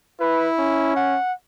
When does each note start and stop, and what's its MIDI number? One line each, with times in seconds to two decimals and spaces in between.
0.20 0.93 64
0.20 0.48 71
0.59 1.18 61
0.96 1.32 78